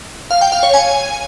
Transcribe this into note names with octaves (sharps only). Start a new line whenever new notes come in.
F5
G5
F5
C#5
G#5